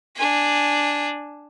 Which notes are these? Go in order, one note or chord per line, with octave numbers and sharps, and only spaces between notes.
D4 G#5